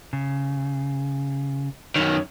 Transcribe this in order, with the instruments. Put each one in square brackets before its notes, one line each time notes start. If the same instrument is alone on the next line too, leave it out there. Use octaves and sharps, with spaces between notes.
[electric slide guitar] C#3
[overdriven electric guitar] F#2 D#3 [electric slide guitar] C#5